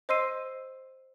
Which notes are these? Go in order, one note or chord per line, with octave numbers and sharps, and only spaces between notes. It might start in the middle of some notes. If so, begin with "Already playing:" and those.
C5 D#5 C6 E6 C7 D#7